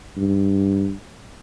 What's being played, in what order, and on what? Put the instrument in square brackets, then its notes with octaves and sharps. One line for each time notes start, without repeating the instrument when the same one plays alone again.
[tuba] G2